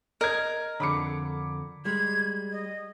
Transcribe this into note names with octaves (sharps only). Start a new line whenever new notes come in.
A#4 D#5 G#6
F2 D3 B5 D6 C#7
G3 G#3 G#6
D#5